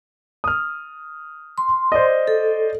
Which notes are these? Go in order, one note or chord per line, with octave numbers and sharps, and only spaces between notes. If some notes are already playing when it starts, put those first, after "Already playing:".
D#6 F6
C6
C5 D5 D#5
A4